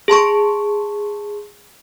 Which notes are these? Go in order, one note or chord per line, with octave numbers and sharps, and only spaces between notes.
G#4 A5 C6 C#6